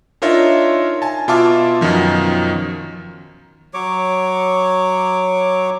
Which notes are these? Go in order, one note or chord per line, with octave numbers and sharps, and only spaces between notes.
D4 D#4 F4 A#4 C#5 E5
G#5 A5
B2 F4 E5 A5 D6 F6
F#2 B2 D#3 F3
F#3 C#5 D6